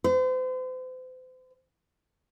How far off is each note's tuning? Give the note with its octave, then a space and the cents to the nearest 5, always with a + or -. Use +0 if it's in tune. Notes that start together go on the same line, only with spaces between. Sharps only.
C5 -40